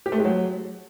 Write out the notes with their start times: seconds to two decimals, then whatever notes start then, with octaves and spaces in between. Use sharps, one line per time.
0.06 G4
0.12 A3
0.18 G#3
0.25 F#3